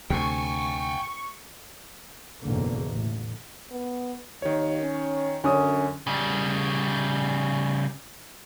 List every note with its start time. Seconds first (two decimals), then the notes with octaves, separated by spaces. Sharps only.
0.10 D2 C3 G5 G#5 C#6
2.42 F#1 E2 G#2 B2 D3 A#3
2.89 A1
3.71 B3
4.42 D#2 D#3 C#5
4.81 C#4
5.44 F#2 D3 C#4 D#6
6.07 C#3 G3